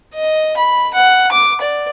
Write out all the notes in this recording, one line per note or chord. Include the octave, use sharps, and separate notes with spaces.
D#5
B5
F#5
D6
D5